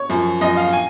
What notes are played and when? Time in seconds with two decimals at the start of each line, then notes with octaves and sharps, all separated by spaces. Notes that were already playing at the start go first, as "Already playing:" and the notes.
Already playing: C#5
0.09 F#2 F3
0.41 F#2 F3 D#5
0.57 F5
0.73 G#5